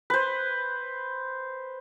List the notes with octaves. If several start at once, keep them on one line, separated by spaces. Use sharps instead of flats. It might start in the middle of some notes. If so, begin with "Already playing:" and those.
B4 C5